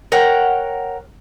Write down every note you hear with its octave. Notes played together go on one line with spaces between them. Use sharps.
A#4 C#5 F#5 G5